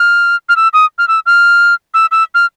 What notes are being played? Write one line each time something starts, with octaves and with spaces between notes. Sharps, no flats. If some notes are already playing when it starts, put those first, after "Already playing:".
Already playing: F6
F6
E6
D#6
F6
E6
F6
E6
E6
F6